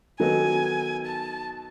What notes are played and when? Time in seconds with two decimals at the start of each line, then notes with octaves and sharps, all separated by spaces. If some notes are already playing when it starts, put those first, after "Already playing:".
0.19 D#3 F#3 B3 D#4 A4 G#5
1.06 A5